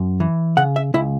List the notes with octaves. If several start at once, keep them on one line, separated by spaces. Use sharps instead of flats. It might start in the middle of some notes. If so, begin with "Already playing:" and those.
Already playing: F#2
E3
C#3 F#5
E5
C#2 E4